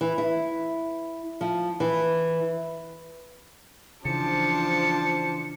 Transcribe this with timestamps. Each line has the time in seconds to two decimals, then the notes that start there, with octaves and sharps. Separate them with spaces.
0.01 E3
0.18 E4
1.41 F3
1.80 E3
4.05 C#3 E3 F3 D4 C5 A5 C#7